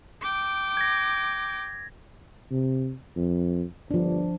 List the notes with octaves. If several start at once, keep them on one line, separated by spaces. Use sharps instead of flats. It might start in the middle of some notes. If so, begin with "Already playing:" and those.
G5 D6
G#6 A#6
C3
F2
G1 F3 D4